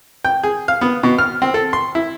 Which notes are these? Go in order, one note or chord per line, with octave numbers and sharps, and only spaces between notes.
G5
G#4
F5
B3
B2
F6
C4
A4
C6
E4